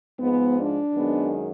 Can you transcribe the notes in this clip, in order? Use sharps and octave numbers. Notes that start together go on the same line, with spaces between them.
G#2 F3 G#3 B3
D4
F#2 D#3 G#3 B3